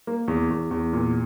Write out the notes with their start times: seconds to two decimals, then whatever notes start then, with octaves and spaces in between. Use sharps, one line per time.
0.07 A#3
0.28 E2
0.50 E2
0.71 E2
0.93 A#2